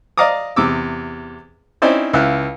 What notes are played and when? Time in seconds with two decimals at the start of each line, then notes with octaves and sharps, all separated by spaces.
0.17 D5 D#5 F5 A#5 D6 D#6
0.56 E2 C3 D6 E6
1.82 C4 C#4 D#4 E4 C5 D5
2.13 C#2 E4 E5 F5 F#6